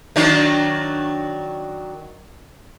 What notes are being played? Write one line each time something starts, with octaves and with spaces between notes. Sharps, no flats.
D#3 F#3 D4